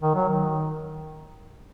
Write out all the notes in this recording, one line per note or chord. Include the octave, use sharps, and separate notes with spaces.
D#3
F#3
D#3